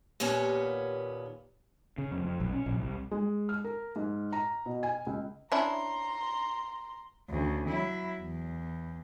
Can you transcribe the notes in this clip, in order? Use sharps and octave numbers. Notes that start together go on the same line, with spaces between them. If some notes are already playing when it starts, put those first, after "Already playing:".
D#2 A#2 B3 C#4 C#5 G#5
C#3
F2
F2
B1
C#4
A#1
C2
G#3
F6
A#4
G#2
A#5
B2
G#5
C#2
C#4 D4 E4 A#5 C6
D2 C#3
F#3 E4
E2